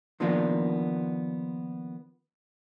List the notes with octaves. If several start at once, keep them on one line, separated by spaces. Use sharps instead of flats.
D#3 F3 A#3 B3 D4 F4